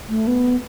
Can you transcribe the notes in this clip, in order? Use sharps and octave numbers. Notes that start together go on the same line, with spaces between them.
A3
B3